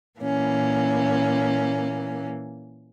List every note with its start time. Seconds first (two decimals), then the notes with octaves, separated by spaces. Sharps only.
0.20 A#2 E3 A#3 C#4